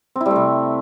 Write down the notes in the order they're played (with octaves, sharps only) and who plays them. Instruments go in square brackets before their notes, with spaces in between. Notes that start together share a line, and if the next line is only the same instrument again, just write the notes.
[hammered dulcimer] C4
E4
G3
A3
C3